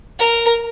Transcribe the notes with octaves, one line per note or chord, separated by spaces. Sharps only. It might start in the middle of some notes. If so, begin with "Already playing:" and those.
A#4